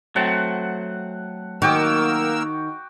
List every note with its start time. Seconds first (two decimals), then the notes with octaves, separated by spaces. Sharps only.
0.16 F#3 A3 C4 F#5
1.62 D#3 A#3 F#4 A#4 G5 D6 E6